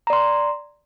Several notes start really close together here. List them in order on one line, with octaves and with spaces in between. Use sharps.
A#5 D5 C6